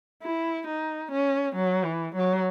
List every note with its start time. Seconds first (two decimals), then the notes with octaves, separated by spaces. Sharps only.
0.23 E4
0.67 D#4
1.12 C#4
1.55 F#3
1.85 E3
2.15 F#3